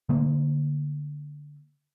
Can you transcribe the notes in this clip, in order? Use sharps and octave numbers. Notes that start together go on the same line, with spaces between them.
D3 A3 A#3